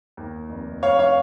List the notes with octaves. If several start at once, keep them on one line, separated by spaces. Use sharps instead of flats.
D#2
F1
F1 C#5 F5
C#5 F5